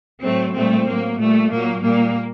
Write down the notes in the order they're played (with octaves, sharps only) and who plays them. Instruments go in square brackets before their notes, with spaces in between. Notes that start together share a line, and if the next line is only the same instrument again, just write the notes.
[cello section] A2 F#3 A3 C4
A#2 G3 A3 C4
A2 F#3 A#3
A#2 G3 A3
A#2 F#3 A#3
A#2 G3 A#3